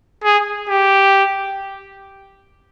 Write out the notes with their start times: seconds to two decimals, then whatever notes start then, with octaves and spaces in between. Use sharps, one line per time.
0.24 G#4
0.69 G4